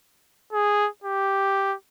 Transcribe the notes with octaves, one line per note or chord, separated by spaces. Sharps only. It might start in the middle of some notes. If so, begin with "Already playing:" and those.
G#4
G4